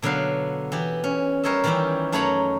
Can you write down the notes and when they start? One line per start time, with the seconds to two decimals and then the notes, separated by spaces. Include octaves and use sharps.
0.02 B2 D3 F#3 B3 F5
0.72 E3 B3 G4
1.04 C#4
1.44 G3 A#4 C5 C#5 D#5 E5
1.64 D#3 E3 G3 C#4 E4 G4
2.12 F#2 A3 D#4 C#5 A#5 B5